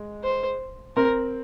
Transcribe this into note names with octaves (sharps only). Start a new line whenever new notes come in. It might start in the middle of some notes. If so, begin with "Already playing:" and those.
Already playing: G#3
C5
C4 A#4